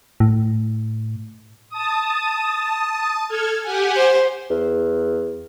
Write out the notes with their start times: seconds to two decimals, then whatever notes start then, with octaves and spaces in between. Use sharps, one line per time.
0.20 A2
1.69 A5 D#6
3.28 A4 F6 G#6
3.61 G4 F#5 G#5
3.96 C5
4.50 E2